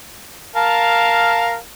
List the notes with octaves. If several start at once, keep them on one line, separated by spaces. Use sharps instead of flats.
A#4 F5 A5